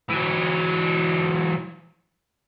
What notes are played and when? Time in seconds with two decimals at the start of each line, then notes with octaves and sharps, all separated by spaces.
0.10 E3 F#3